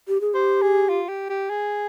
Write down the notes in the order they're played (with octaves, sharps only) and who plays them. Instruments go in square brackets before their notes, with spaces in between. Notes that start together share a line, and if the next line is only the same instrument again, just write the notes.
[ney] G4
G#4
[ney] G4 [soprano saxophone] C5
[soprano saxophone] G#4
F4
G4
G4
G#4